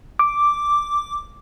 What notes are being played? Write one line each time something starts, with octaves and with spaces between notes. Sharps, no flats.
D6